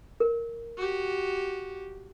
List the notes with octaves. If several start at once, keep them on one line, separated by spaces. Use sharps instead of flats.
A#4
F#4 G4